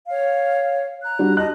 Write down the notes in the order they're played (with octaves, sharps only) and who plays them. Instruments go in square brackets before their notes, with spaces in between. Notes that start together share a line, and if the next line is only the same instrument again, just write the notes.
[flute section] C#5 F5
A#5 F#6
[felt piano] G3 D4 F#4
[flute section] D#5 A5 [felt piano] F#6